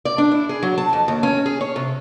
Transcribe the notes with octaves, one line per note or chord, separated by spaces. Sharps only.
D5
D4
E4
G#4
F#3
A5
F2
D#2
C#4
G#4
C#5
C3